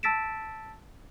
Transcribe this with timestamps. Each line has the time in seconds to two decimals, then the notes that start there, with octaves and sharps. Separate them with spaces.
0.03 A5 E6 A6 B6 D7 E7